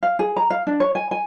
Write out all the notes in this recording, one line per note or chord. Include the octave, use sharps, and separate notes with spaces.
F5
G#4
A#5
F5
D4
C#5
G#5
G#5